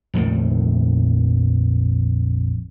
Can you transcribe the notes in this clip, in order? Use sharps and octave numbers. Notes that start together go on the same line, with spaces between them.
A#1 F2 D#3 A3